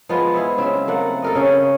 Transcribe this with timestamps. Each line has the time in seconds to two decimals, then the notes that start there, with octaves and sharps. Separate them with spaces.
0.09 F3 G#3 B3 F4
0.34 E4 G#4 E5
0.58 C#3 C4 E5
0.88 A3 A#3 F#5
1.22 A4 A#4 D#5
1.35 C#3 C#4